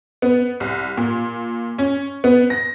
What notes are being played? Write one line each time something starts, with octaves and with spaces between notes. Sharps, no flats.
B3
C2
A#2
C#4
B3
A#6